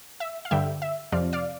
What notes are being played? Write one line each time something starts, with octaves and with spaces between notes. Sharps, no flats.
E5
F5
G2 D3 G3 E5 G5
E5
F2 C3 F3 C4 D5 F5
D5 F5